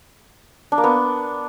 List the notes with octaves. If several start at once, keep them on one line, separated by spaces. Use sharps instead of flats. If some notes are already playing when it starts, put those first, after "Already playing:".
D4
A#3
B3